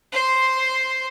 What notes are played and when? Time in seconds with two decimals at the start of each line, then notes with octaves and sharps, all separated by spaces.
0.12 C5 C6